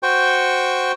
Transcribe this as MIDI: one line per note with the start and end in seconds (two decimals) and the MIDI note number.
0.03 0.92 66
0.03 0.92 72
0.03 0.92 79
0.03 0.92 85